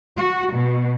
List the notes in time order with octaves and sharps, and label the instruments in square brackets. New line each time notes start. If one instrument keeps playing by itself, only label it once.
[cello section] F#4
B2